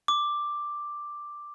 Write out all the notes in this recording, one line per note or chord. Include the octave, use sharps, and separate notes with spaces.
D6